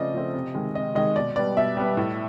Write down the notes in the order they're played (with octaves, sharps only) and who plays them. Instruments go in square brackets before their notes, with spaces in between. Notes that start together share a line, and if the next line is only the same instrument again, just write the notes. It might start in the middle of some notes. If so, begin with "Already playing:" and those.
Already playing: [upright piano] C#3 F3 A3 C4 D5 D#5
F3 A3 C4
C3
D#3 G#3
C3 D#5
D#3 G#3 D#5
B2 D5
G3 B3 D5
B2 E5
G3 B3
A2